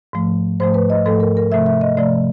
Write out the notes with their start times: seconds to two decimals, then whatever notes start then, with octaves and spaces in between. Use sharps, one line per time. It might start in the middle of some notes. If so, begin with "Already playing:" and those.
0.13 G#2 F3 A3
0.60 G#2 F3 A3 C5
0.74 B4
0.90 D#5
1.06 G#2 F3 A3 A4
1.20 A#4
1.37 A#4
1.52 C3 F3 A3 E5
1.66 E5
1.81 D#5
1.97 C3 F3 A3 D5